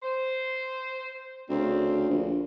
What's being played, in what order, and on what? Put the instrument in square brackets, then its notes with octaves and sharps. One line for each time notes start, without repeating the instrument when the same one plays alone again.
[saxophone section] C5
[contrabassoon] D2 [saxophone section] C#3 C4
[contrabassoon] A#1